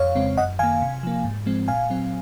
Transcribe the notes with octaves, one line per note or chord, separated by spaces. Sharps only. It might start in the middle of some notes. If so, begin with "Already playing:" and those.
Already playing: F2 C#5 F5
C#3 G#3 C4
F#2 D#5 F#5
D#3 A#3 F5 G#5
C3
F3 A#3
G#2
F3 G#3 C4
A#2 F5 G#5
F#3 C4